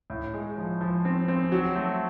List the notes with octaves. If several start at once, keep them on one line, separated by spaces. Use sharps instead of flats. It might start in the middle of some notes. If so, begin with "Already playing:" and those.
A2
G#3
F3
F3
C4
C4
F#3
A3